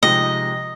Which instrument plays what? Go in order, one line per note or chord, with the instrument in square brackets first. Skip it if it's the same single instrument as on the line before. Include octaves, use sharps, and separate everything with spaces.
[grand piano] C3 F3 G#3 D#4 G4 [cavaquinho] D#5